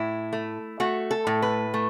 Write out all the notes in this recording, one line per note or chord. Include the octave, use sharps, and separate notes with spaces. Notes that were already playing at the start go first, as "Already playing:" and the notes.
Already playing: A2 E4
A3
A3 F#4
A4
A2
B4
A3